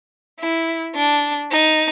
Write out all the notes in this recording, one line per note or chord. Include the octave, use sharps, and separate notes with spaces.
E4
D4
D#4